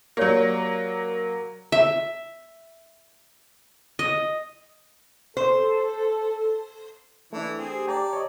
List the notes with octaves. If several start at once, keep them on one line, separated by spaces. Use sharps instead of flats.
F#3 A#3 G4 C#5 D5
E5
D#5
A4 C5
E3 A3 D4
C4 G#4
G4
D5 G5 A5 A#5
C#5 D#5